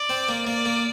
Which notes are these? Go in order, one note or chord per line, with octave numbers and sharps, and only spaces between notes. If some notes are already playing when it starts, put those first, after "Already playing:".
Already playing: D5
C4
A#3
A#3 D5
A#3